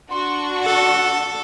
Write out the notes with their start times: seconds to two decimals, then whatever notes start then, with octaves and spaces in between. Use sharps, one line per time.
0.11 D4 F#4 C6 C#6
0.64 A4 F#5